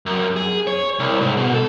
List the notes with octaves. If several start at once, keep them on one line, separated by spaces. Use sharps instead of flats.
F#2
G#4
C#5
C2
G#2
B2
A4